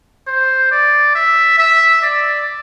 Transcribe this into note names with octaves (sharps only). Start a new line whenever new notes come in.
C5
D5
E5
E5
D5